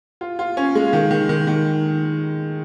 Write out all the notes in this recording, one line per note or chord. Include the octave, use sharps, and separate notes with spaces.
F4
F4
C#4
G#3
D#3
D#3
D#3
D#3